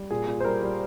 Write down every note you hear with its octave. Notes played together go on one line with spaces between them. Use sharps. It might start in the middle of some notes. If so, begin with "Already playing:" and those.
Already playing: G3
A#2 G#4
A#2
C5
G3 A#4
G3